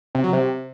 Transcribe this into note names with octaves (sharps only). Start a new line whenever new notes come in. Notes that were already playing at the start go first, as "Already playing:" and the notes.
C3
F#3
C3